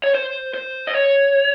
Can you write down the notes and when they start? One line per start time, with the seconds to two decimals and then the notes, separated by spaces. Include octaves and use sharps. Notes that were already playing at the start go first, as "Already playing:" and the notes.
0.04 C#5
0.15 C5
0.54 C5
0.87 D#5
0.94 C#5